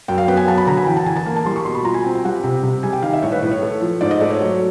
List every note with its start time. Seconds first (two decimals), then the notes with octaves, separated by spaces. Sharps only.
0.08 F#2 G5
0.18 F5
0.28 B3 G5
0.37 G#5
0.47 F#3 A5
0.58 B5
0.67 D3 A#5
0.77 G#5
0.87 E3 G5
0.97 A5
1.06 E3 G#5
1.16 A5
1.26 A#3
1.36 A5
1.45 G3 C6
1.56 C#6
1.65 B2 C6
1.75 B5
1.85 F4 A#5
1.94 G#5
2.04 C4 G5
2.15 G5
2.24 G3 F#5
2.34 G5
2.44 C3
2.63 C3
2.83 G3 G#5
2.93 G5
3.02 D#3 F5
3.13 E5
3.23 A2 C#5
3.32 B4
3.42 A2 B4
3.51 C#5
3.62 A3
3.81 F3
4.01 G#2 D5
4.11 D#5
4.20 A3 D5
4.31 C#5
4.40 F#3